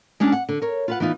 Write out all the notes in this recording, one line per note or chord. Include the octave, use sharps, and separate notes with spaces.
G#3 C#4 D4
F#5
D3
A#4 C#5
F4 B4 F#5
E3 B3 D#4 F4